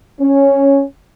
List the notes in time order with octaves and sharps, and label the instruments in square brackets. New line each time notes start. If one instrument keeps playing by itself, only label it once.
[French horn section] C#4